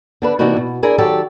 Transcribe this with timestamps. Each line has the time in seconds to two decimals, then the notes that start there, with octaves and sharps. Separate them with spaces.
0.22 D3 D4 B4
0.39 C3 E3 A#3 D4 D#4 F#4
0.57 B2
0.83 D4 E4 G#4 A#4 D5
0.98 D#3 F#3 G4 A4 C#5 D5